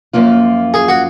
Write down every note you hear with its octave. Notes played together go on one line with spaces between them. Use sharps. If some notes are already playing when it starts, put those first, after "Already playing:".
F#2 F3 A#3 F4
G#4
F#4